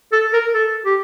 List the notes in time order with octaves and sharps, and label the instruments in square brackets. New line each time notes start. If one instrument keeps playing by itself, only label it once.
[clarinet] A4
A#4
A4
G4